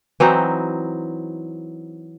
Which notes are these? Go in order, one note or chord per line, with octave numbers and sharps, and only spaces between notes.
E3 F#3 C4 D#4